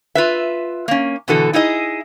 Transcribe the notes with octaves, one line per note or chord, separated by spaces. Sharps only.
F4 B4 E5
A#3 C#4
B2 D3 E3 F#4 A4
D#4 E4 G#4 D#5